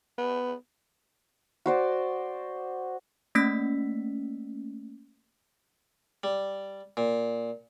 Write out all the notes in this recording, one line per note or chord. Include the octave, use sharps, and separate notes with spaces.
B3
F#4 C5 D5
A3 A#3 C#4 E6 B6
G3
A#2